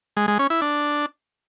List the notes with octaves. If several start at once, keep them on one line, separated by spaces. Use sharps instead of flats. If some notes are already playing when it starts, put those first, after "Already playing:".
G#3
G#3
C#4
E4
D4